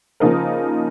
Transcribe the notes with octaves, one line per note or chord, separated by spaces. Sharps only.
C#3 F3 A#3 D#4 A#4